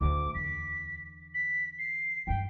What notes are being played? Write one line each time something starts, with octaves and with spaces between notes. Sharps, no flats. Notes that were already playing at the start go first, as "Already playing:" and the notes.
D2 A2 D6
E2 D3 B6
B6
C7
G2 E3 G5